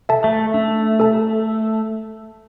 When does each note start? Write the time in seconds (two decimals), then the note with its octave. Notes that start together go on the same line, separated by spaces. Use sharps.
0.09 A4 E5 A5
0.24 A3
0.54 A3 D4
1.00 A4 E5 A5